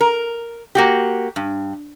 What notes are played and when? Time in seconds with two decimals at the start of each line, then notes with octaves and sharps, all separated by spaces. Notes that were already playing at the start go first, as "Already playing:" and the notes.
0.01 A#4
0.75 A#3 F#4 G4
1.36 G2